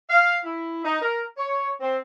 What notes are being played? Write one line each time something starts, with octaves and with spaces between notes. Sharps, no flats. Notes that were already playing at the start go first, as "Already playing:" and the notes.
F5
E4
D#4
A#4
C#5
C4